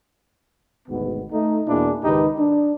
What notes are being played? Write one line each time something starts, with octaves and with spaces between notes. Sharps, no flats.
G#1 D2 G#2 B2 B3
A3 D#4
E2 B2 A#3 D4 E4 G#4
C#2 G#2 D#3 D#4 G4 B4
D4